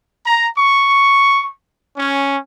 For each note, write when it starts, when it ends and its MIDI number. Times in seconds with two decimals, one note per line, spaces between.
0.24 0.48 82
0.58 1.49 85
1.97 2.36 61